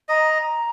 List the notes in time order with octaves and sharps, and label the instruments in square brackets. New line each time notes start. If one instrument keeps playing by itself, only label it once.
[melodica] D#5 [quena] A#5